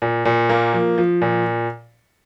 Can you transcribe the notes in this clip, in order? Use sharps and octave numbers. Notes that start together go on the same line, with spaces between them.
A#2
A#2
A#3
F3
F3
A#2